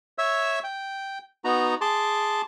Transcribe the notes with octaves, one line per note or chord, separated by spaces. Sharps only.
C#5 E5 E6
G5
B3 D#4 F#4 A#5
G#4 A5 C6 D6